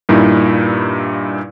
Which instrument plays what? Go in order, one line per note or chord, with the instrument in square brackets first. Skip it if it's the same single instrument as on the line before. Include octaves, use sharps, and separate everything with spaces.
[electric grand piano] G2 A#2 D#4 E4